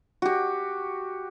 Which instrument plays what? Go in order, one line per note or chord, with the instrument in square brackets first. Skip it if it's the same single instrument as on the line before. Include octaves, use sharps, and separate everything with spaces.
[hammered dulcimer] F#4 G4